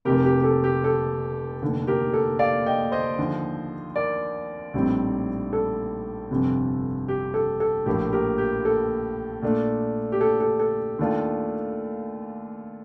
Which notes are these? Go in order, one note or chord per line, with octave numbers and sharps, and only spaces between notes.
F1 F2 C3 G4 A#4
G4
G4
A4
G4
A4
F1 D#2 D3
G4 A#4
A4
D5 F5
D#5 G5
C5 D#5
D#2 D3 F3
A#4 D5
A#1 A2 G3 C4 D#4
A4
G1 F2 C3
G4
A4
A4
A#1 A2 F3 A#3 G4
G4 A#4
G4
A4
A#2 A3 D4
G4
A4
A4
A4
D#2 D#3 A3 D4 F4